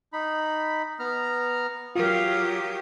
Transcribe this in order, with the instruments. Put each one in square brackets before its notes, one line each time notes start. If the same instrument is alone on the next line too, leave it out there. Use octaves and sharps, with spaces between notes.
[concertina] D#4 B5
B3 A#5 F6
[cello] F#3 G4 [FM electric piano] F4 A#4 [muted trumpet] F5 [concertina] D#6